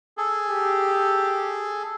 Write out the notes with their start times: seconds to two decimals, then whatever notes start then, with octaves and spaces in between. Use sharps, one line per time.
0.17 G#4 A4
0.49 G4